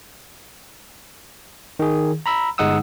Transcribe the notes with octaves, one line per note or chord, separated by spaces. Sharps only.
D#3 G#4
A#5 B5 E6
G1 G#3 D#4 F#5 D#6 E6